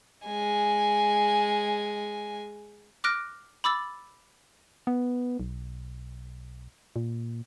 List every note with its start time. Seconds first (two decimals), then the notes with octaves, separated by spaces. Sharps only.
0.25 G#3 G#5
3.04 D6 F6 F#6 A#6 D7
3.64 B5 D6 E6 A6
4.87 B3
5.40 B1
6.96 A#2